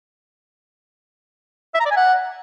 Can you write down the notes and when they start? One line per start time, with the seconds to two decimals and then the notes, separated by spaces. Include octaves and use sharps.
1.75 E5
1.80 A#5
1.85 D5
1.91 G#5
1.96 F#5